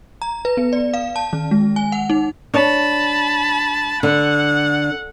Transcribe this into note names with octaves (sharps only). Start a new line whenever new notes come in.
A#5
B4
B3
D5
F5
A5
D#3
G#3
G#5
F#5
D#4
D4 C#5 A5 B5
D3 F#5